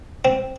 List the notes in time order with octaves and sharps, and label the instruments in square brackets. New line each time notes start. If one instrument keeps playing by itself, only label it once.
[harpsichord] C4